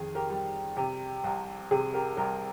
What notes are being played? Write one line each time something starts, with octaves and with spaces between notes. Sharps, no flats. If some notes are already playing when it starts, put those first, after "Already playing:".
Already playing: F2 D#3 G#4
G4 A#4
G3
C3 G4
C2
C3 G#4
G4 A#4
C2 G4 A#4